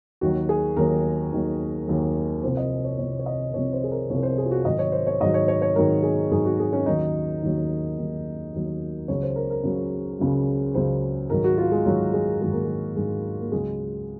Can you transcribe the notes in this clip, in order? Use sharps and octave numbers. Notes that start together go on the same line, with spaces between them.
D#2 D#3 F#3 F#4
G#4
D#2 D#3 F#3 A#4
D#2 D#3 F#3
D#2 D#3 F#3
C2 C3 F3 C5
D#5
C#5
C2 C3 F3 C#5
C#5
D#5
C2 C3 F3 C#5
C5
G#4
A#4
C2 C3 F3 C#5
C5
G#4
F4
F#4
G#2 D#3 F#3 D#5
C#5
C5
C#5
G#2 D#3 F#3 D#5
C#5
C#5
C#5
G#2 D#3 F#3 A#4
G#4
G#2 D#3 F#3 G#4
F#4
G#4
C#4
D#2 D#3 F#3 D#4
D#2 D#3 F#3
D#2 D#3 F#3
D#2 D#3 F#3
C#2 C#3 F#3 C#5
C5
A#4
A#4
C#2 C#3 F#3
C#2 C#3 F#3
C#2 C#3 F#3 C5
G#2 D#3 F#3 A#4
F#4
F4
G#3
G#2 D#3 F#3
G#3
G#2 D#3 F#3 G#3
A#3
G#3
G#2 D#3 F#3 G#3
A#3
C#2 C#3 F#3 G#3